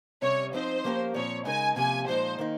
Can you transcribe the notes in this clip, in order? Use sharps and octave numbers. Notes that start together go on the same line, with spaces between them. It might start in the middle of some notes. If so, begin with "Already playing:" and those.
C3 G3 C#4 C#5
F3 C4 D#4 C5
F3 A#3 C#4 G4 A#4
A#2 F3 C4 C#5
C#3 G#3 D#4 A#4 G#5
C3 F3 A#3 C#4 G4 G#5
A#2 F3 G#3 D#4 C5
D#3 A#3 D#4